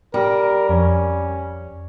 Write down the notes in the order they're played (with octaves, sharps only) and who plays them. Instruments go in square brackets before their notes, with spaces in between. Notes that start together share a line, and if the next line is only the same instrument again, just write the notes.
[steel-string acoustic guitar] G3 [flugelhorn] A#4
[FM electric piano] F2 [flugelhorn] C#4